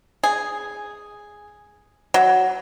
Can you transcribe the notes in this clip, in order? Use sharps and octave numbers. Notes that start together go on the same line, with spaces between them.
G#4
F#3